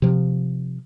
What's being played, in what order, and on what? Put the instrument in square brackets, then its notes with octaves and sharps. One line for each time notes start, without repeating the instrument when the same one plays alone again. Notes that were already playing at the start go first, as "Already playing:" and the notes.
[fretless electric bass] C3 F3